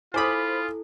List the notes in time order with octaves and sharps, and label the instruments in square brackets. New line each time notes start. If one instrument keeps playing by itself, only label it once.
[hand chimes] E4 A4 [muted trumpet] F4 [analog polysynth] C5 B5 [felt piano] G#5 D6 D#6